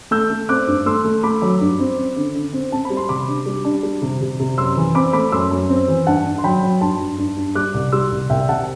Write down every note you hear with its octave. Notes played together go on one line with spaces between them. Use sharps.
A3 E6 G6
A3
C4 D6 F#6
G2
A3 C6 E6
A3
A3 B5 D6
F#3
G2
C4
C4
D3
D3
C4
C4 A5
B5
G3
C6
C3 B5 D6
D4
G3
D4
G3
C3
C3
C3
F#2 C6 E6
E3
C4 B5 D6
A3 B5 D6
F#2 C6 E6
F#2
C4
E3
G2 F#5 A5
G2
C6
F#3 G5 B5
F#3
G2 A5 C6
G2
G2
G2
G3 D6 F#6
C2
G3 C6 E6
C2
C2 E5 G5
C3 F#5 A5